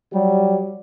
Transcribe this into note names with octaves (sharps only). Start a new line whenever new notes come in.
F#3 G3